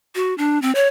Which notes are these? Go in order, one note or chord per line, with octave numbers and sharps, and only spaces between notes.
F#4
D4
C4
C#5